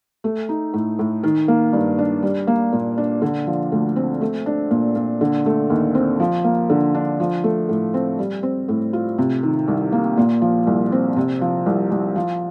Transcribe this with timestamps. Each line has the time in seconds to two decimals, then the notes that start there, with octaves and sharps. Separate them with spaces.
0.24 A3
0.49 D#4
0.74 A2
0.99 A2
1.23 D#3
1.48 A#3
1.73 G2
1.98 D4
2.23 G3
2.47 A#3
2.73 A#2
2.98 D4
3.22 D3
3.47 F3
3.72 D2
3.96 C4
4.21 A3
4.46 D4
4.71 A#2
4.96 A#2
5.21 D3
5.46 A3
5.70 D#2
5.95 C4
6.20 F3
6.44 A#3
6.70 D3
6.94 D4
7.20 F3
7.44 A3
7.69 A2
7.94 C4
8.19 G3
8.43 C4
8.68 A2
8.93 F4
9.18 C3
9.43 D#3
9.68 C2
9.92 A#3
10.17 A#2
10.42 F3
10.67 C2
10.92 C4
11.16 C3
11.41 F3
11.66 C2
11.91 C2
12.16 F3